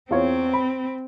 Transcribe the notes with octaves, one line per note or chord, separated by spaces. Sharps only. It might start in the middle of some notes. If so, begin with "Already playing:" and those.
E2 C4 F4 C#5
B5